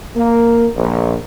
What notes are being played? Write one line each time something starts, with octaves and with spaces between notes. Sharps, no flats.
A#3
A#1